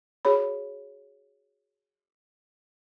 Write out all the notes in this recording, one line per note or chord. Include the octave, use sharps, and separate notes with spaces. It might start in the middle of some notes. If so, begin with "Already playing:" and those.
F#4 G#4 C#5 B5